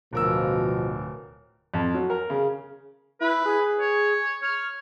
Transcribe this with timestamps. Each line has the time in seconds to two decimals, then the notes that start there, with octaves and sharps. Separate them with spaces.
0.13 D1 B2 F3 A#4 E6
1.74 F2
1.94 F#3
2.10 A#4
2.30 C#3
3.21 E4 B4
3.45 G#4
3.80 C#5
4.42 C#5 F6